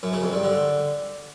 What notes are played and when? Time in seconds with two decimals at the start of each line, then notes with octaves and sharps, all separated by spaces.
0.03 F#2
0.13 C#3
0.23 F2
0.33 G2
0.43 D3